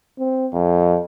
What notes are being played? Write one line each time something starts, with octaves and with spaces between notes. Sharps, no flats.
C4
F2